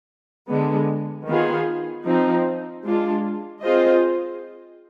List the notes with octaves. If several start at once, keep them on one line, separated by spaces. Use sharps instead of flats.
D3 G#3 B3
D#3 B3 F4 G#4
F3 C4 D#4
G#3 D4 F4
C4 F4 G#4 C5 D#5